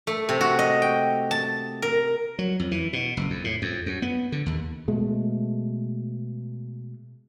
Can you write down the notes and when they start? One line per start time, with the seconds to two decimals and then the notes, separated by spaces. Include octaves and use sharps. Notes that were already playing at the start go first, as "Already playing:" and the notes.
0.07 A3
0.29 C3
0.41 F#4
0.59 D#5
0.82 G5
1.31 A5
1.82 A#4
2.39 F#3
2.60 F2
2.71 E3
2.93 B2
3.17 F#1
3.30 F2
3.44 A2
3.62 F2
3.86 F#2
4.02 B3
4.32 D3
4.46 D#2
4.88 B2 G#3 A3